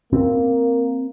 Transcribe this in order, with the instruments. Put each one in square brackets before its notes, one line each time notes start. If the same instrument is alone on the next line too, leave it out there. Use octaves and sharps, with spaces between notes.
[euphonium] A#3 [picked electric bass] C4